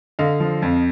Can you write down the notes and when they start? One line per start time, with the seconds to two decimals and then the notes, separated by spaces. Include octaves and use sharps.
0.19 D3 D#5 F5
0.40 F3
0.62 F2